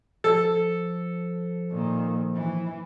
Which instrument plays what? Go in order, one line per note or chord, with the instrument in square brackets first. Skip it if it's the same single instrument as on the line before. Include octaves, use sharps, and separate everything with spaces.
[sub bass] F3 [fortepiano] A4
[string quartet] A#2 D#3
E3